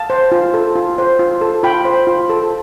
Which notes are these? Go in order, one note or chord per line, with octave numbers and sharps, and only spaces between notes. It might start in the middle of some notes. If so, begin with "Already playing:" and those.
Already playing: F5 A5
C5
F4
A4
F4
C5
F4
A4
F4 G5 B5
C5
F4
A4